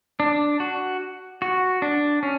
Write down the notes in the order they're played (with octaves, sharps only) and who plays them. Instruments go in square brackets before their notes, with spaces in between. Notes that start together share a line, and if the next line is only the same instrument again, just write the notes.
[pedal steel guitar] D4
F#4
F#4
D4
C#4